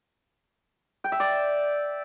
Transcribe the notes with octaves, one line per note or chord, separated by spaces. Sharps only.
G5
E5
D5